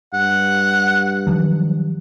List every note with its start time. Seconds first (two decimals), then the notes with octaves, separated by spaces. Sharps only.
0.14 G2 F#5
1.27 D#3 F3 F#3